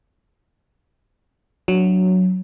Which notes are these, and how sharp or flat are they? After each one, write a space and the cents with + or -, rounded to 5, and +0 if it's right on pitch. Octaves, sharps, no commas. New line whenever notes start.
F#3 +0 D4 +0